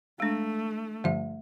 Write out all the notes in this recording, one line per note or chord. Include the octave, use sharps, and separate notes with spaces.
G#3 A3 D4
G2 D3 F3 A3 E5